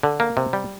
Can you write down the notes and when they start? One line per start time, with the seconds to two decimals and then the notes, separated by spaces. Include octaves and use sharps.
0.03 D3
0.20 A#3
0.37 C3
0.53 G3